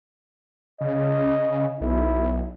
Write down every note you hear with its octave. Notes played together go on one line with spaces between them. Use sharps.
C#3 D#5
B1 E4